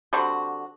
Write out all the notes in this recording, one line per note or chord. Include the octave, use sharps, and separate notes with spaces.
D3 G3 C4 F#4